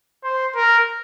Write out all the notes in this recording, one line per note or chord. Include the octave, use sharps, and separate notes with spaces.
C5
A#4